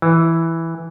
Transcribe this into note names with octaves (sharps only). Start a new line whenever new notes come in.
E3